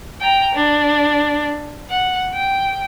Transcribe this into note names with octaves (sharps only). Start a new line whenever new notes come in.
G5 A#5
D4
F#5
G5